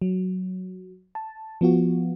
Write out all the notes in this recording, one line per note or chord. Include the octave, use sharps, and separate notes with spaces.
F#3
A5
F3 B3 F4 F#4